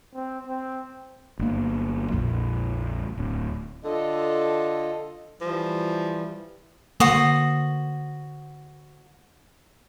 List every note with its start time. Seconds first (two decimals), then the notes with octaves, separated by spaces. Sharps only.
0.15 C4
0.47 C4
1.39 G1 A#3
2.12 A#1 F2
3.18 D1
3.84 D3 F4 A4 D#5
5.41 E3 F3 G3
7.00 D3 A#3 F#4 C5 D#6